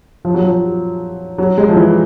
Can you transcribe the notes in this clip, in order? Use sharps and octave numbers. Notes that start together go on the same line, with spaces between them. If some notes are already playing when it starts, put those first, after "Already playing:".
F3
F#3
F3
F#3
G#3
F3
E3